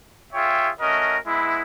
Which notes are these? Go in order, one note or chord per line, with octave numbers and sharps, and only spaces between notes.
F4 G#4 C#5 E5 G5
A3 C#4 F#4 A#4 D#5
G#3 B3 E4